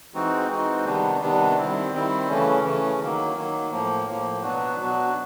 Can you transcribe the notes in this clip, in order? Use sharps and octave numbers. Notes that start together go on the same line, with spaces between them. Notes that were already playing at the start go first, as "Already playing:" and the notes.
E3 G#3 C4 D#4 F#4
E3 G#3 C4 D#4 F#4
C3 D#3 G3 B3 D4
C3 D#3 G3 B3 D4
D#3 G3 C4 E4
D#3 G3 C4 E4
C#3 E3 A3 C#4
C#3 E3 A3 C#4
D#3 F#3 A#3
D#3 F#3 A#3
A2 F3 A#3
A2 F3 A#3
B2 F#3 B3 D4 F#4
B2 F#3 B3 D4 F#4